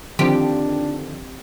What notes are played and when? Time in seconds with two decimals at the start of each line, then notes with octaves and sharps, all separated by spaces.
0.19 D3 D#3 F3 C4 D4 G4